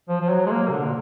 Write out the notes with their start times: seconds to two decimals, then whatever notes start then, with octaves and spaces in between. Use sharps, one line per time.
0.09 F3
0.21 F3
0.29 F#3
0.46 G#3
0.51 A#3
0.68 B2
0.71 D3
0.85 A#2